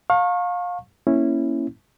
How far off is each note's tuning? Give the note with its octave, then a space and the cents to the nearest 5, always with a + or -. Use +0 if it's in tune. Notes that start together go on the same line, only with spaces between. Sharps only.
F5 +25 A5 +45 C#6 -25
A#3 +0 C#4 -10 E4 +0